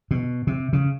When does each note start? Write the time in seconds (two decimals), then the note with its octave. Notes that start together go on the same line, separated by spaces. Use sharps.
0.11 B2
0.47 C3
0.73 C#3